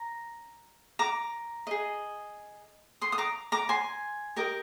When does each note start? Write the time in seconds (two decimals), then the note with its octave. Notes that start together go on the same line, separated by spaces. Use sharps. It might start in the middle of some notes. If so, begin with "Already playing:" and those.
Already playing: A#5
0.99 A#5 D6
1.67 G#4 D#5
3.01 C6 D#6
3.12 D#6
3.18 A#5 D6
3.52 A#5 D6
3.69 G#5 C6
4.36 G4 A#4 D#5